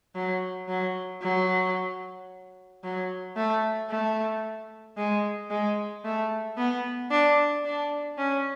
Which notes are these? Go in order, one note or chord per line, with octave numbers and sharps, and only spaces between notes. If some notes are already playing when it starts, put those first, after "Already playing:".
F#3
F#3
F#3
F#3
A3
A3
G#3
G#3
A3
B3
D4
D4
C#4